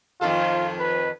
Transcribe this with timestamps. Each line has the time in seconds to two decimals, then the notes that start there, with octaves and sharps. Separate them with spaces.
0.21 F2 D#3 F4 A4
0.79 B4